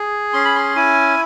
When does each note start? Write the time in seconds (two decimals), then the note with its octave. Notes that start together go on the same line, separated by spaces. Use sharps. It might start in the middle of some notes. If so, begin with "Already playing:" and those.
Already playing: G#4
0.33 C#4 C6
0.45 B5
0.56 C6
0.76 E4 G#5